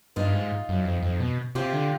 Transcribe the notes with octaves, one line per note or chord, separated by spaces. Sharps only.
G2 D#4 F4
G#2
F#2
F2
F2
B2
C3 F4 G4
D3